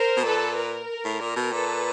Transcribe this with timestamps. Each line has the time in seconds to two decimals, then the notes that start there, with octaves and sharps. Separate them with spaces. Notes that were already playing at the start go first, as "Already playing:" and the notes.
Already playing: A#4 C5
0.17 B2
0.24 A#2 A4 B4
0.56 A#4
1.04 A2
1.20 A#2
1.36 B2
1.51 A#2 A4 B4